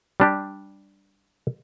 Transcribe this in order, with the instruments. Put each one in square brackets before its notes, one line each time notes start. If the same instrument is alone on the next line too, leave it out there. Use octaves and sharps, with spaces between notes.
[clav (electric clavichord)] G3 D4 G4